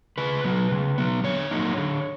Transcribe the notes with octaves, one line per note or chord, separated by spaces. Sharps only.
C#3 B4
F#3 B3
C#3
F#3 B3
D3 C#5
F#3 A#3 D#4
D3